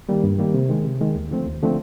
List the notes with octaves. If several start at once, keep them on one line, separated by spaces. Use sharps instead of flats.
D#3 G3 A#3
G2
D#3 G3 A#3
C3
D#3 G#3
C3
D#3 G#3
D#2
D3 F3 A3 C4
D#2
D3 F3 A3 C4